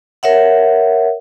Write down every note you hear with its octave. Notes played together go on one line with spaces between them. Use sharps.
A#4 C#5 E5 F#5